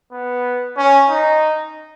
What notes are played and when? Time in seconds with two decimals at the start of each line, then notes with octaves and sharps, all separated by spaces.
0.12 B3
0.77 C#4
1.09 D#4